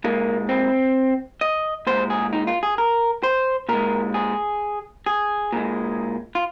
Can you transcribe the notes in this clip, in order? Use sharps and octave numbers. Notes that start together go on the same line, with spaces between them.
A#2 G#3 A#3
C4
D#5
A#2 G#3 C5
G#4
D#4
F4
G#4
A#4
C5
A#2 G#3 A#4
G#4
G#4
A#2 G#3
F4